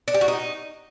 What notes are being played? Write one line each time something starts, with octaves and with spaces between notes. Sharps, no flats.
D4
G4
F#4
D#4